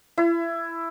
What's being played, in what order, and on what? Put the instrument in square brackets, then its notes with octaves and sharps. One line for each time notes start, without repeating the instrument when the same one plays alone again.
[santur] E4